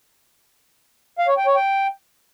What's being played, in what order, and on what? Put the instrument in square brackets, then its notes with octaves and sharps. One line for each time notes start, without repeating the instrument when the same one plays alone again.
[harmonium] F5
C#5
G5
C#5
G5